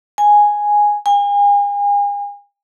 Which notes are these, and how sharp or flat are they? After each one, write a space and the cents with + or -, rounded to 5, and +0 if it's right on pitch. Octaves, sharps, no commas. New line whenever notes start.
G#5 -5
G#5 -40